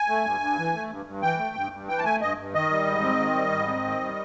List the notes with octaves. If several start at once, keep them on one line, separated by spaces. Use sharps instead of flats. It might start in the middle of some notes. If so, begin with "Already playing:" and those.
Already playing: G#5
A3
G2
G2
E3
A3
G2
G2
E3 G5
A3
G2
G2
E3 G5
A5
A3 G#5
G2 D#5
G2
D#3 D#5
G3
G#2
C4
D#3
G3
G#2
C4
D#3
G3